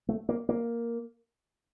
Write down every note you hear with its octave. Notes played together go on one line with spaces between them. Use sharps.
A3
A#3
A#3